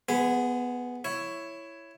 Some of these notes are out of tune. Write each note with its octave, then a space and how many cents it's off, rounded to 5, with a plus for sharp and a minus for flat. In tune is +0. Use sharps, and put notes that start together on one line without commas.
B3 +0 G#4 +0 C5 -45
E4 +10 C#5 +0